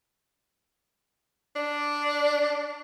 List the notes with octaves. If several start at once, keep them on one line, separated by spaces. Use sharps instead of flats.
D4